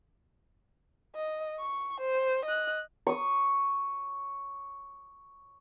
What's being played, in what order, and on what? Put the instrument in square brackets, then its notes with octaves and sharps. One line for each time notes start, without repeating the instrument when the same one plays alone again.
[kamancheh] D#5
C#6
C5
D#5 F#6
[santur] C#6 D#6